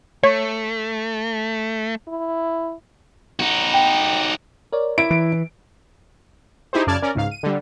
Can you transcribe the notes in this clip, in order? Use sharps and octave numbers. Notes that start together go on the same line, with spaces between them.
A3 C#5
E4
D#4 F#4
G5
A#4 C#5 D5
E4 D7
E3
D#4 E4 G4 G#4 C5
F#2 C#3 D5 A5 F6 G#6
C#4 A#4 D5
C#2 G#2 F5
D#7
D3 G3